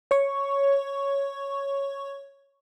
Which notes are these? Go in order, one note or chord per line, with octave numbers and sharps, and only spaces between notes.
C#5 C#6